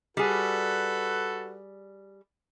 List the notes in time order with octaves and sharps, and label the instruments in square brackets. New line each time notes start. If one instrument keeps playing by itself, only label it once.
[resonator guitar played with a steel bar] G3 G#4 [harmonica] F#4 A4 B4